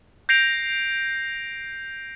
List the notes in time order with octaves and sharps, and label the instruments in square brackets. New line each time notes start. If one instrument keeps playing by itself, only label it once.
[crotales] G6 A#6 C7 D7 F7